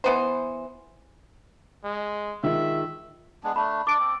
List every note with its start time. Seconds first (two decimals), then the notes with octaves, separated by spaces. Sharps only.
0.04 E3 B3 C5
1.84 G#3
2.43 D#3 G#3 F4 E5
3.44 G#3 B3 D4
3.56 A3 D4 B5
3.87 D4 D5 D6 D7
3.99 C4